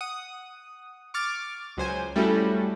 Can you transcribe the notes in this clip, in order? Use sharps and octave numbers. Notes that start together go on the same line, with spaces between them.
F#5 D#6
C#6 D6 F6 A6
C#2 F#3 C5 G#5
G3 A3 C#4 E4 F#4 A4